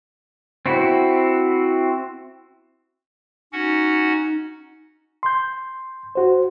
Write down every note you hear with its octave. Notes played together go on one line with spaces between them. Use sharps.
C4 E4 F#4
C#4 D#4 F#4 F#5
C6 G6
F#4 C5